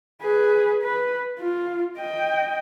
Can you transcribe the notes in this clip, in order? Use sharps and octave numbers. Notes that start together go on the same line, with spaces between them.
G#4 B4
B4
F4
D#5 G5